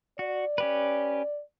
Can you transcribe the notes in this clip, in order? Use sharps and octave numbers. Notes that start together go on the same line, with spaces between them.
F#4 D5
C#4 G4 B4